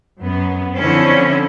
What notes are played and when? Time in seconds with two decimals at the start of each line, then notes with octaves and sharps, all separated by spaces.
0.21 F#2 B3
0.80 D3 F3 C4 C#4 E4